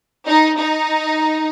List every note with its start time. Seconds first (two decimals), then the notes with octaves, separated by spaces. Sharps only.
0.26 D#4
0.58 D#4